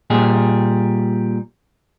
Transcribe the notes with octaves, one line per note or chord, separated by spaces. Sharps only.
A#2 G3 G#4